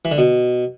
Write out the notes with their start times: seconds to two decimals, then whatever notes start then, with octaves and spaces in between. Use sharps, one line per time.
0.05 E3
0.12 D3
0.18 B2